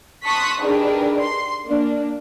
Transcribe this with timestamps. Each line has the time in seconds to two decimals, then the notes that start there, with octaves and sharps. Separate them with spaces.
0.24 A5 C6 C#6 D#6 F#6 B6
0.62 D#3 D4 G4 G#4 A#4 B4
1.21 C6
1.67 A#3 D4